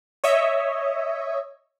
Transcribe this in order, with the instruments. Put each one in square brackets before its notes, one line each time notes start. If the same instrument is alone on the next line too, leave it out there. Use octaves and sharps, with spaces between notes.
[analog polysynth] C#5 D#5 E5